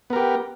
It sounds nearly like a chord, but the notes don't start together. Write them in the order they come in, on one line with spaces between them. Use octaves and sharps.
B3 A#4 G4